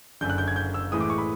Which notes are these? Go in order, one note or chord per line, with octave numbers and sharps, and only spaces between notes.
F#1 F#2 D3 G6
F#6
G6
G#6
G6
E6
A2 E3 G#3 D#6
D6
C#6
B5